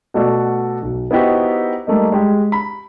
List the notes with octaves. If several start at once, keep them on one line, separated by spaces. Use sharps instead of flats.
B2 A3 F#4 A4 D5 F#5
B1
B3 D#4 E4 F#4 G4 C5
G3 A3 A#3 D#4
G#3 G4
B5